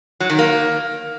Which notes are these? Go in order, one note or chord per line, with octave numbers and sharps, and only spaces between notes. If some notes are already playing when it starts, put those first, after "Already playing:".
F#3
D#3
A#3